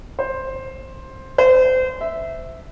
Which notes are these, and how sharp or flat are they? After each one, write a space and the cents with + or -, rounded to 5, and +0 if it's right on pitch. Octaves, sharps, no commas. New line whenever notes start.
C5 +10
C5 -30
E5 -5